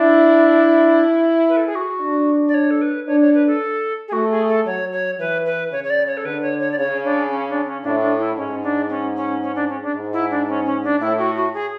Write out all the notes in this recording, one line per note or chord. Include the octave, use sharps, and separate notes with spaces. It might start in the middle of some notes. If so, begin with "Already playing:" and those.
Already playing: D4 E4
B4
A4
G#4
F#4
D4
D5
C#5
A4
B4
D4 C#5
C#5
B4
A4
G#4
A3 F#4
G#4
A4
F#3 C#5
C#5
E3 B4
B4
C#3 C#5
C#5
D5
C#5
A4
D3 B4
C#5
C#5
D5
C#3 C#5
D4
C#4
D4
C#4
A2 D4
D4
E4
G#2 C#4
D4
C#4
C#4
C#4
D4
C#4
D4
G#2
E4
D4
C#4
C#4
D4
A2 E4
F#4
F#4
G#4